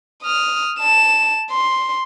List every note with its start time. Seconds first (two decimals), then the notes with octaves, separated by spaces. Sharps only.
0.23 D#6 F6
0.79 A5 E7
1.51 C6